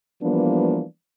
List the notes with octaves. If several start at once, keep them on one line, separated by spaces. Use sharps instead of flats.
E3 F3 G3 A#3 B3 D4